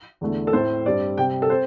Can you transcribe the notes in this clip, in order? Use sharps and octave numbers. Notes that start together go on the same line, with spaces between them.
E2 D3 A3
A4
A2 A3 C4 C5
G2 G3 C4 D5
C3 G3 C4 G5
A4
C4 C5